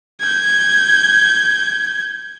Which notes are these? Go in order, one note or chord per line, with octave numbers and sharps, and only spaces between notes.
G6 G#6